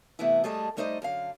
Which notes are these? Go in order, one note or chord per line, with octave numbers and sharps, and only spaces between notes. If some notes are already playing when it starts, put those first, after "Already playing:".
C3 E3 A3 B3 E4
G#2 G3 A3 G#4 D#5 A5
G3 A3 D#4 C5 D5 D#5
F#2 D3 F5